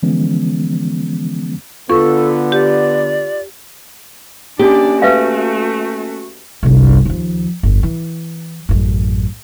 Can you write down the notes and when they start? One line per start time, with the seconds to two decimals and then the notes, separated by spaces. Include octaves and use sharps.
0.03 D3 E3 F3 G#3 B3 C#4
1.89 D3 B3 F4 A4 C#6
2.52 G4 D5
4.59 A#3 C#4 D4 G4 D5 G#5
5.02 A3 F#4 B4 E5 F5
6.63 G1 C2
7.05 D#2 F3
7.63 G1 F2
7.83 E3
8.69 A1 F#2